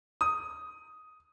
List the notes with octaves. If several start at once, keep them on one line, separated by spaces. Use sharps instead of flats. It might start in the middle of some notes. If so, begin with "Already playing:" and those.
D#6